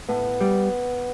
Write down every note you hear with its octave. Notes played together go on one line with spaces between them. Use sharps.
A2 B3
G3